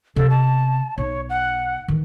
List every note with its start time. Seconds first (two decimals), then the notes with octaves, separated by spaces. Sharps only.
0.16 C3 B3 A4
0.30 A5
0.98 B1 C#5
1.29 F#5
1.88 D#3 E3